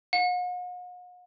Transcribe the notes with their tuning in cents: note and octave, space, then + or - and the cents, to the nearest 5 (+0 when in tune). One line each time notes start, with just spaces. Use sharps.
F#5 -45